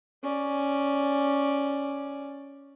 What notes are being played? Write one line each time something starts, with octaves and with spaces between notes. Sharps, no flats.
C#4 D5